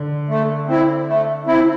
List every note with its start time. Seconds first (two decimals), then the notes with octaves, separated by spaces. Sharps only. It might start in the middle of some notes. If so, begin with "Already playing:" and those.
Already playing: D3
0.29 A3
0.68 C4 E4
1.08 A3
1.46 C4 E4